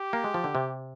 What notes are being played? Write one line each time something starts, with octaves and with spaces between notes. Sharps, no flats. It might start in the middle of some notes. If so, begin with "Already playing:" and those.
Already playing: G4
A#3
G#3
F3
D3
C3